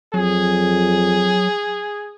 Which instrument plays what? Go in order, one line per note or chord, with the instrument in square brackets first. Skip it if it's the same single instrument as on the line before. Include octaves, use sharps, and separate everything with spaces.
[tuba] F2 [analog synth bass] F#3 [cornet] G#4